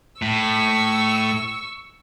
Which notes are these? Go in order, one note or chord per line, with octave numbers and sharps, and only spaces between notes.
A2 C#6 E6